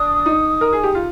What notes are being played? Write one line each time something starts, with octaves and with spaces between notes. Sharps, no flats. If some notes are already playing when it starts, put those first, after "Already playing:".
Already playing: D4 D#6
D#4
A#4
G#4
G4
F4